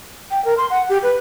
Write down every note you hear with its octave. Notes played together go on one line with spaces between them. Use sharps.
G5
A#4
C6
F#5
G4
B4